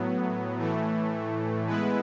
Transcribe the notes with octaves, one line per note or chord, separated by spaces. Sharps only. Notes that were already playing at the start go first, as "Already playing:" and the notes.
Already playing: A2 F#3 B3
A2 E3 A3
G#3 B3 E4 B4